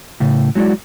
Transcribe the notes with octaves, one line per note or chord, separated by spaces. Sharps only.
A2 C#3
F#3 G#3 E4 F#4 D5